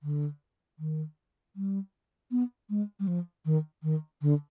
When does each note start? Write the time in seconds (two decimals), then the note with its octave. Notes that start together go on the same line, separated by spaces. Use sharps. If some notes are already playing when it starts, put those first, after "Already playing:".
0.03 D3
0.79 D#3
1.56 G3
2.31 B3
2.70 G#3
2.99 G3
3.07 F3
3.45 D#3
3.83 D#3
4.22 D3